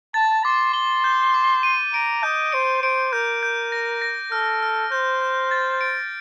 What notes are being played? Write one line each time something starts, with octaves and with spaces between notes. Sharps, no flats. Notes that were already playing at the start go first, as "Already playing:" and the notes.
A5 A6
C6 D6
C6 G7
G6
D6
D#7
A#5 D7
D#5 G6
C5 D7
C5 D7
A#4 G6
G6
A#6
A#6
A4 F6
F6
C5 G6
G6
A6
D7